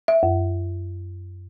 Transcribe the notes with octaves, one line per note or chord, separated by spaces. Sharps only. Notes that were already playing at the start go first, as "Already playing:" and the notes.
E5
F#2